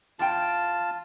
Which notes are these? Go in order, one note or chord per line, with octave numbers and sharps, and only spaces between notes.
E2 F4 G5 A5